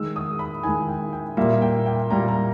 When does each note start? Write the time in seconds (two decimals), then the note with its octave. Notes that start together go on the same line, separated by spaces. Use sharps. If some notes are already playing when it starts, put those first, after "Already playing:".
Already playing: D#3 G#3 E6
0.16 D#6
0.39 B5
0.63 D#3 G#3 G#5
0.88 G5
1.13 G5
1.37 A#2 G3 A#3 E5
1.62 G5
1.86 G5
2.10 A#2 G3 A#3 A#5
2.28 A#5